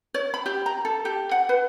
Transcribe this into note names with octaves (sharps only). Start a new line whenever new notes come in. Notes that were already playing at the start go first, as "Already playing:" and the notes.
C#5
B5
G4
A#5
A4
G4
F#5
B4